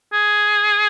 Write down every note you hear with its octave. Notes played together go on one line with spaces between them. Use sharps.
G#4